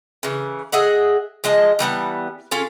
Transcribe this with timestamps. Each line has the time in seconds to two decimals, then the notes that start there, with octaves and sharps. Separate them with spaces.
0.23 C#3 E3
0.72 G#4 D#5 E5 F#5
1.44 F3 G#3 D#5 A5
1.79 E3 G3 B3 A5
2.51 C#4 F4 G#4 A4